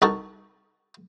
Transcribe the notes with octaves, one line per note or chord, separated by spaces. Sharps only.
C2 D#4 F#4 A4 A#4 A5